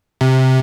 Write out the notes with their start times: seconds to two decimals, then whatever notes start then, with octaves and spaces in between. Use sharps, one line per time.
0.21 C3